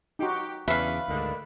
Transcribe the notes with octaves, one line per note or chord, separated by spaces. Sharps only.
D#4 F#4 G4
E2 C#3 C#4 D4 B4 E5 F5
D2 G#2 D3 D#3 D4